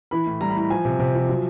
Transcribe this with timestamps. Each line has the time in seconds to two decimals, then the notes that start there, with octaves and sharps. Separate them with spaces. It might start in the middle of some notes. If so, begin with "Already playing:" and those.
0.11 E3 B5
0.26 A2
0.41 G3 A#5
0.50 B5
0.56 A2 A#5
0.70 F3 G#5
0.85 C3
0.99 C3
1.15 F3
1.29 F#3